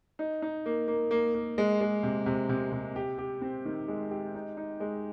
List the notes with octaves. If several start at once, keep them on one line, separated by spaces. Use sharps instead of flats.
D#4
D#4
A#3
A#3
A#3
A#3
G#3
G#3
C3
C3
C3
C3
G4
G4
C4
D#3
G#3
G4
D#4
D#4
G#3